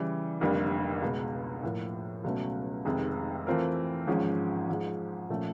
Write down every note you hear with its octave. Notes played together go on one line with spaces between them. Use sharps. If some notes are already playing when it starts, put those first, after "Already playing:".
Already playing: C#3 E3 G3
F1 F2 D3 G3 A#3
C#2 B2 G#3
A2 F3 A#3
C#2 B2 F#3 A3 C#4
F1 F2 C3 D#3 G#3
E3 A3 C4 F4 A#4
G#1 G#2 F3 G#3 C#4
G#2 F3 G#3
A#2 F3 A3 C#4